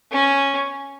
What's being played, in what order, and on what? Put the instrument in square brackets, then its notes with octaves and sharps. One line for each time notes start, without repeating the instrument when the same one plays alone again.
[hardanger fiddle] C#4